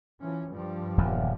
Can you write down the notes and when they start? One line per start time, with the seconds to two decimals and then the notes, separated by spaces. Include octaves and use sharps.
0.21 E3 F3 C#4
0.50 G2 F3 G3
0.98 D#1 E2